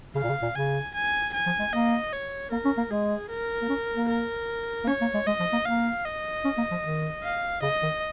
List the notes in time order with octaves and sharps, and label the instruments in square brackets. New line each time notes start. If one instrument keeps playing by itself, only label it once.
[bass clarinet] C#3 [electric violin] F5
[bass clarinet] A#2
C#3
A#2
[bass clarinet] C#3 [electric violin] G#5
[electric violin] G#5
G#5
[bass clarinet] F3
G#3
[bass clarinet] A#3 [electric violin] D#5
[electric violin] C#5
[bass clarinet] A#3 [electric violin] A#4
[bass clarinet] C#4
A#3
[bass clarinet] G#3 [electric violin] G#4
[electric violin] A#4
[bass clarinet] A#3
C#4
A#3
[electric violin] A#4
[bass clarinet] A#3
[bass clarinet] C#4 [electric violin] C#5
[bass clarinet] A#3
G#3
[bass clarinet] G#3 [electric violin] D#5
[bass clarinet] F3
A#3
[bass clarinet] A#3 [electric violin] F5
[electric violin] D#5
[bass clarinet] C#4
A#3
F3
D#3
[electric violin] F5
[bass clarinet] C#3 [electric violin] D#5
[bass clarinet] D#3